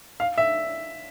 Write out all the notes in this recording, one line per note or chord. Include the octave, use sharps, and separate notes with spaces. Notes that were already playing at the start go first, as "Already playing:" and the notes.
F5
E5